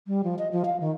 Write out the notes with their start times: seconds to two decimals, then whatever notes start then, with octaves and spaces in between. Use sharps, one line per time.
0.07 G3
0.24 F3
0.39 D#5
0.52 F3
0.65 F5
0.81 D#3